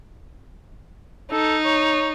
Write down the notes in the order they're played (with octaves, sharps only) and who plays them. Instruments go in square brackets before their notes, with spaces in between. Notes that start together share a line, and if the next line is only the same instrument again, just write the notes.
[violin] D#4 [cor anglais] A4
[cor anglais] C#5